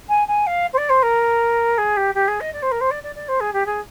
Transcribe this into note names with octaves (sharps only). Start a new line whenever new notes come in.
G#5
G#5
F5
C5
D5
C5
A#4
G#4
G4
G4
G#4
D#5
D5
C5
A#4
C5
D5
D5
D5
C5
G#4
G4
G#4